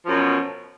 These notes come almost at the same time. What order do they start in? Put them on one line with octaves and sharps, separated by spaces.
F3 F#2 B2